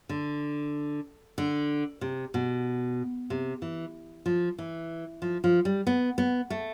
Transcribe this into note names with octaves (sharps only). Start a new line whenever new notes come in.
D3
D3
C3
B2
C3
E3
F3
E3
F3
F3
G3
B3
B3
A3